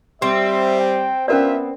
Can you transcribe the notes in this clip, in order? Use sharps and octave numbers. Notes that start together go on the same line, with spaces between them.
G3 C4 E5
G5
B3 C#4 D4 F4 A#4 D5 E5